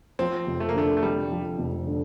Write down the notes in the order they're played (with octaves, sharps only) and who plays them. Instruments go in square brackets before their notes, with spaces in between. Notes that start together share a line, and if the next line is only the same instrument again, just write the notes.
[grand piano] F3 [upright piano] C4
[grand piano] F1
[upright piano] A3
A#3
[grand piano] D3 [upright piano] A3
[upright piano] A3
[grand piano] F2 [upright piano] G3
[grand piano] F3
F1
D3